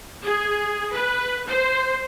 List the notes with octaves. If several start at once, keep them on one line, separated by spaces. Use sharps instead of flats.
G#4
B4
C5